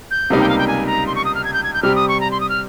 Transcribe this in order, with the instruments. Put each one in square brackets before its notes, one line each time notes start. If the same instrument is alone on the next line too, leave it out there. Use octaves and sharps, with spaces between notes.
[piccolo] G6
[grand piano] C#2 C3 G3 A#3 D#4
[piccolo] G5
F5
G5
G#5
A#5
C6
C#6
D#6
F6
G#6
G6
G#6
G6
[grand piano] C3 G3 C4 G4 [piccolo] F6
[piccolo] D#6
C#6
A#5
C6
D#6
F6